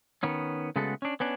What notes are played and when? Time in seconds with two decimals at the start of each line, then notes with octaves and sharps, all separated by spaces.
0.23 D#3 B3 C#4
0.76 C#3 G#3 A3 B3 F#4 A4
1.02 C#4 D4
1.20 B3 C#4 D4